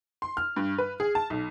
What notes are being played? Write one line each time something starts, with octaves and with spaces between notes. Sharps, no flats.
C6
F6
G2
B4
G#4
A5
B1